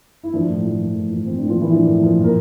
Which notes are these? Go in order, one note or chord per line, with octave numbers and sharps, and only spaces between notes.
E4
F3 D4
A2
F3
F3
A2
F3
F3 C4
A2 D4
F3 F4
A2 E3 E4
F3 D4
A2
F3
A#2
A#4